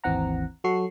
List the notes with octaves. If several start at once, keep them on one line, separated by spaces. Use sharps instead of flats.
G#1 D#2 E3 C4 F#5 A#5
F#3 F#4 A4 C#6 C7